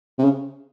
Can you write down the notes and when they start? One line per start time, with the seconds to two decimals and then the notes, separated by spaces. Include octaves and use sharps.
0.19 C3
0.24 C#3